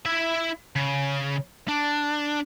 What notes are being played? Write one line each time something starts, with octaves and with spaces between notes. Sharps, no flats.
E4 E5
C#3
D4